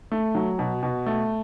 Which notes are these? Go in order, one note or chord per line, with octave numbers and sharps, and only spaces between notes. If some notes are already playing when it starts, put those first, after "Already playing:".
A3
F#3
B2
B2
A3